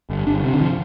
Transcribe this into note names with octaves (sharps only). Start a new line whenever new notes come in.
G1
G1 D4
C3
D3
F3